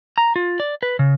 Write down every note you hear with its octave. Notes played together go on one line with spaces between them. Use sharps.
A#5
F4
D5
B4
C#3